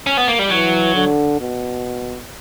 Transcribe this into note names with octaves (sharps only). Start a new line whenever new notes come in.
C#4
B3
A#3
G3
E3 F#3
D3
B2